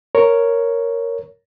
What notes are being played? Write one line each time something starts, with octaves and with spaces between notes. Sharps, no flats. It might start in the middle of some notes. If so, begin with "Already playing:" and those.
A#4 C#5